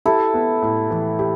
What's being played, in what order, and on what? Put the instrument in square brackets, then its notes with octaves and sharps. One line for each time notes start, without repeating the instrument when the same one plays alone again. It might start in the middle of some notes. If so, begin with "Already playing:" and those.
[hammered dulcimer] E4 A4 [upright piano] G4
[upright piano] B3
A2
E3
G4